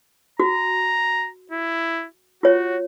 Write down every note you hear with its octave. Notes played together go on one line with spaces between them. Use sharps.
F#4 A#5
E4
F4 F#4 C#5